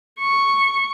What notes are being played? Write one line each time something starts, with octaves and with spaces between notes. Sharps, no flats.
C#6